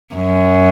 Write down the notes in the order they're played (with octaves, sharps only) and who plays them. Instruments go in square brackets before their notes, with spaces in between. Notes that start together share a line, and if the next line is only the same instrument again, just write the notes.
[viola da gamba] F#2